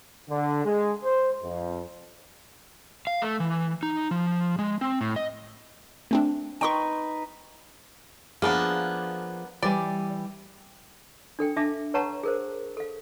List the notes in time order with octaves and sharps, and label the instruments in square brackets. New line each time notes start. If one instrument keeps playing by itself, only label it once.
[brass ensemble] D3
G#3
C5
F2
[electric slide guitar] F5
A3
E3
D#4
F3
G#3
C4
A2
D#5
[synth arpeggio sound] A3 C4 D4
[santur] D#4 B4 [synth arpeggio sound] G5 C6 C#6
[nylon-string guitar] F3 G#4 [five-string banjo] A#3 B3 D4
[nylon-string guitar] E3 G3 G#5 [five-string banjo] D5
[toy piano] D4 A4 G5
D4 E5 F5 A5 D6
B4 C#5 F#5 A5 A#5 C#6
G#4 A#4 C5
A4 F5